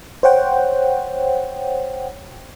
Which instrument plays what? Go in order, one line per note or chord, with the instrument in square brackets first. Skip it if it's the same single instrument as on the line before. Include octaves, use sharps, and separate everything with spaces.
[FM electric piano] C5 C#5 F#5 G5